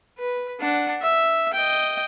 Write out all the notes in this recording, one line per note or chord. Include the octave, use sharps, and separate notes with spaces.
B4
D4 F#5
E5
D#5 G5